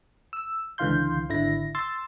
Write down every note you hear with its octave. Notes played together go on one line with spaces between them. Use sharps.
E6
C#2 D3 E3 F5 C6 G6
G#1 D3 E4 A#6
C6 E6 A6